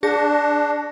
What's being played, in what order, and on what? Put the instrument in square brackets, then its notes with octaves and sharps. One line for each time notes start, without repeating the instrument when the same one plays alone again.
[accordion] D4 [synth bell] G#4 A#6